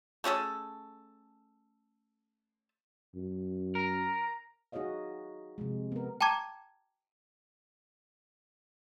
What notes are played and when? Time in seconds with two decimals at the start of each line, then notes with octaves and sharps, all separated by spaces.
0.24 A3 C#4 G#4 A4
3.15 F#2
3.75 A#4 A#5
4.72 D#4 F#4 G#4 C#5 D#5 F5
5.58 C3 F3 G#3
5.92 B3 A#4
6.21 G5 A5 A#5 D6 G#6